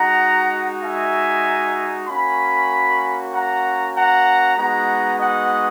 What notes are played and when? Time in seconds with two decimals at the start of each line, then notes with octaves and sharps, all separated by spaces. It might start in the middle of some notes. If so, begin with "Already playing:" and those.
Already playing: G#3 D#4 F#4 F#5 A#5
0.83 E5 G#5
2.08 A#3 C#4 F#4 G#5 B5
3.33 F#5 A#5
3.96 F#5 A#5
4.57 G#3 B3 D#4 F#4 F#5 A#5
5.20 D#5 F#5